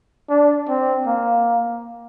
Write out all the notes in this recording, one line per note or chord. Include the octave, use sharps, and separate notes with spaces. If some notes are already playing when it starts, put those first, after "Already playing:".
D4
C4
A#3